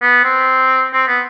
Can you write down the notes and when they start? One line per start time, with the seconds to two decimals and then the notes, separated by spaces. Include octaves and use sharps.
0.02 B3
0.24 C4
0.93 C4
1.08 B3